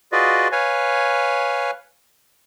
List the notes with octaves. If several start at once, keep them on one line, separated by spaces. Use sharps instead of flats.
F4 F#4 G#4 B4 D5 D#5
B4 C#5 F5 G#5